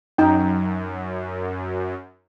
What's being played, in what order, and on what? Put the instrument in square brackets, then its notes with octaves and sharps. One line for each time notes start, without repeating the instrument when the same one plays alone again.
[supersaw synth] F#2 [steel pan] D#4 G5